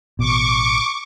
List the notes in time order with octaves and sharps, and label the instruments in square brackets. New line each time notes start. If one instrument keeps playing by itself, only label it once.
[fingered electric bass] A1 B2 [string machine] C#6 D6